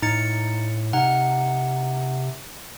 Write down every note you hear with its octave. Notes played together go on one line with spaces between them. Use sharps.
A2 D#4 A6 C#7
C3 D#4 F#5